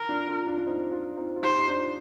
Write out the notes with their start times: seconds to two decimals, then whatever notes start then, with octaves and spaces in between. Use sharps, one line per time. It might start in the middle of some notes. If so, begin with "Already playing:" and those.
Already playing: A#4
0.09 D4 F4
0.28 D4 F4
0.47 D4 F4
0.57 D4
0.66 C4 D#4
0.91 D4 F4
1.17 C4 D#4
1.36 F4
1.42 D#4 G4 C5
1.58 D#4
1.68 D4 F4